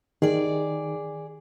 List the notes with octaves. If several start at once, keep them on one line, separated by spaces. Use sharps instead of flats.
D#3 G#4 D5